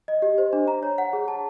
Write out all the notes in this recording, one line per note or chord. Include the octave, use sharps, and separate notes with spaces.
D#5
G4
C5
D4
A#5
C#5
F#5
G#4
A5